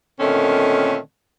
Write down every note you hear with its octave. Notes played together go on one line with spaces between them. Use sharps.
A#2 D3 D#3 A3 C4 C#4